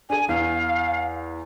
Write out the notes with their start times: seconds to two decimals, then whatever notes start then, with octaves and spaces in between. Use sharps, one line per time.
0.10 D4 G#4 G#5
0.29 E2 F5